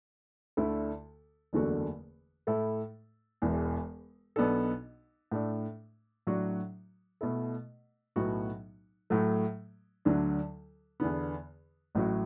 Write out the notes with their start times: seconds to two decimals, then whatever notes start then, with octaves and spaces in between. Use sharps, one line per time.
0.57 D2 D3 A3 E4 A4
1.53 F#1 E2 D3 A3 F#4
2.47 A2 A3 E4 A4
3.42 E1 E2 E3
4.36 B1 B2 B3 D4 A4
5.31 A2 A3 D4 A4
6.27 A2 F#3 D4 F#4
7.21 B2 A3 E4 A4
8.16 B1 A2 F#3 B3 F#4
9.10 A2 F#3 A3
10.05 D2 D3 F#3 D4
11.00 E2 D3 B3
11.95 A1 A2 F#3 A3 F#4